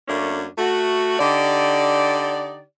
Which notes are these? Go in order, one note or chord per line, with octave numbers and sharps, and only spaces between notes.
F#2 A3 A#3 C#4 D4
A3 F#4
D3 D#4 G4 D5